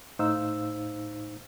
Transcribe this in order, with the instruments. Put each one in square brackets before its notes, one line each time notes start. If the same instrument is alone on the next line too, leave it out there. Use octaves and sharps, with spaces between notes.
[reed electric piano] A2 D#4 C5 F5 E6